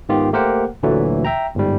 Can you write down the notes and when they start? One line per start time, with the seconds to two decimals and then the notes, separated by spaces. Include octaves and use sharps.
0.09 G#2 D#3 B3 F4 G4
0.33 A3 A#3 G4 A#4 C5 F#5
0.83 D2 A#2 D3 E3 F#3 A3
1.25 E5 G5 A#5
1.55 G1 G#2 G3